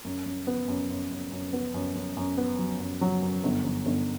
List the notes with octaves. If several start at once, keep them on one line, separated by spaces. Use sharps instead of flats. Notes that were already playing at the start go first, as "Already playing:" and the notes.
F#2
F#2
B3
F#2
F#2
F#2
F#2
B3
F#2
F#2
F#2
B3
F#3
F#2
F#3
F#2
G1
G1
G1